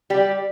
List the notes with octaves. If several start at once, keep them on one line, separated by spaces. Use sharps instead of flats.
G3 G4